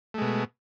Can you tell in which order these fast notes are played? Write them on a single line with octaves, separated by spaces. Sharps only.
A3 G#3 B2